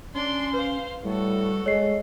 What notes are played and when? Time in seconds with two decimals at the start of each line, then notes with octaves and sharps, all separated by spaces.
0.14 C#4 D4 C6
0.54 B4 C5 F5
1.04 A2 G3 F#4 A4
1.66 G#3 G#4 C#5 D#5 C7